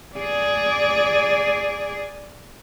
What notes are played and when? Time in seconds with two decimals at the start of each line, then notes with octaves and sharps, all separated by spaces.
0.17 G#4 D5